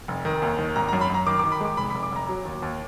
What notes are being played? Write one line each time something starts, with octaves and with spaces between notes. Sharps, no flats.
F1
D#3
D#2
D#3
G#1 A#5
A#5
F#2
B5
F#2 A#5
D#3 D6
D6
D#3
B5
G#3 D6
F1 B5
B5
F1
D6
F1 A#5
F#3
D#2
D#2